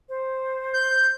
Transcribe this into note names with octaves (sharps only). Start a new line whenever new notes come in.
C5
G6